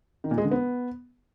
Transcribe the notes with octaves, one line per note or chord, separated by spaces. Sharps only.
D#3
A#2
G#3
D3
B3